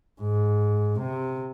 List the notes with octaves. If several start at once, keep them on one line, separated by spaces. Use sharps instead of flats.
G#2
C3